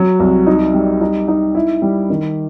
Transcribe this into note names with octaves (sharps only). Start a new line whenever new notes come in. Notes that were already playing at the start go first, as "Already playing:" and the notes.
Already playing: F#3
C2
D#4
G3
D#4
D#4
E4
G3
D#3